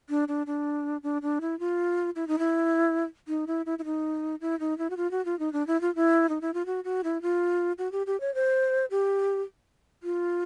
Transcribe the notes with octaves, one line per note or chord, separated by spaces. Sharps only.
D4
D4
D4
D4
D4
E4
F4
E4
D#4
E4
D#4
E4
E4
E4
D#4
E4
D#4
E4
F#4
F4
F#4
F4
D#4
D4
E4
F4
E4
D#4
E4
F4
F#4
F#4
E4
F4
F#4
G4
G4
C#5
C5
G4
F4